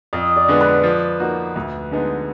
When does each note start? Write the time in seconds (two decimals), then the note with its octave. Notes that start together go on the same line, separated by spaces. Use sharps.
0.13 F2 D#5
0.36 D5
0.48 D3 G#3 B3
0.61 B4
0.84 F3
1.20 A#3 D#4 F#4
1.56 D2
1.91 D3 G#3 B3 D#4